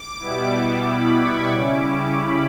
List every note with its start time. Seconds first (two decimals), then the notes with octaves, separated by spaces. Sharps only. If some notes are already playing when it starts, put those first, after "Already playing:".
Already playing: D6
0.19 B2 G3 B3 E4
0.86 B5
1.19 C#6
1.52 C#3 G3 C#4 E4 D6
2.18 B5